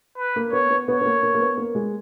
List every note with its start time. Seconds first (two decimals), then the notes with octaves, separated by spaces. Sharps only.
0.18 B4
0.36 A#3
0.53 B3 C#5
0.70 B3
0.88 B3 C#5
1.01 B3
1.05 A#3
1.23 A#3
1.34 A#3
1.40 B3
1.57 A#3
1.75 G#3